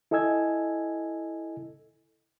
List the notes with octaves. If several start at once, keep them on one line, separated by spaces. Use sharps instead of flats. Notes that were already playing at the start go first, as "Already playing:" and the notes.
E4 A4 D#5 G#5 E6 G#6